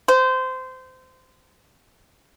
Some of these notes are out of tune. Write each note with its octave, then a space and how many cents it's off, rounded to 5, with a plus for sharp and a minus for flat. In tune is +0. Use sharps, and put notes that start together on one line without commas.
C5 -20